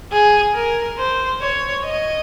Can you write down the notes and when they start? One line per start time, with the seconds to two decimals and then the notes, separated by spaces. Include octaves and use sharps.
0.12 G#4
0.55 A#4
0.98 C5
1.41 C#5
1.85 D#5